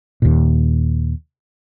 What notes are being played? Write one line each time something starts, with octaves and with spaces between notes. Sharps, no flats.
D#2 A#2